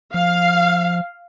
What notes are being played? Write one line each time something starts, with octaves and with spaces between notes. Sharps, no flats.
F3 F5